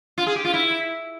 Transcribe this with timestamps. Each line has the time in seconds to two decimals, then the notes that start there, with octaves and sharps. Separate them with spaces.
0.18 F4
0.27 G#4
0.36 G4
0.45 F4
0.54 E4